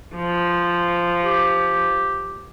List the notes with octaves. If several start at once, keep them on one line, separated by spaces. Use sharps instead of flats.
F3
G4